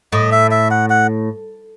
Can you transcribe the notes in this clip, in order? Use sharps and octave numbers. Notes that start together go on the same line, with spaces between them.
A2 D#5
E5
E5
F#5
F#5